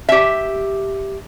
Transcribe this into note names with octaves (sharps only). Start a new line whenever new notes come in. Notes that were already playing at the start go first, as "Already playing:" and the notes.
G4 E5